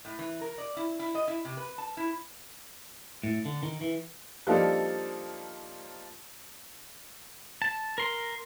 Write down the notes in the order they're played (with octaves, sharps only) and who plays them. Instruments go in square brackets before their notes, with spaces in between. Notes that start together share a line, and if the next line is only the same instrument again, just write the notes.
[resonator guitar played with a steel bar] A2
E3
A#4
D5
E4
E4
D#5
E4
C3
B4
A5
E4
[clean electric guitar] A2
D3
D#3
E3
[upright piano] F3 G3 A#3 D4 D#4 A4
[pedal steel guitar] A5
A#4 C6